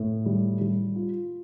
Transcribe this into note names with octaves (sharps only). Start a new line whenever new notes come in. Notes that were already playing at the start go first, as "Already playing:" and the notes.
Already playing: A2
G3
G3
F4